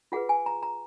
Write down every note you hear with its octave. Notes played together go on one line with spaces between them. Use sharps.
F4 G#4 B4 F#5
G#5
A#5
A#5